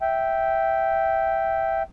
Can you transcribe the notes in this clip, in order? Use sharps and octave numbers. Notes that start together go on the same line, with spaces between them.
E5 G5